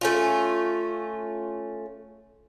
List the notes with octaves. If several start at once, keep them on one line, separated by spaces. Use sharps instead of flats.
A3 C#4 F4